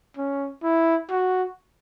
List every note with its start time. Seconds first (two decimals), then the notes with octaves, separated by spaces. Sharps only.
0.17 C#4
0.63 E4
1.10 F#4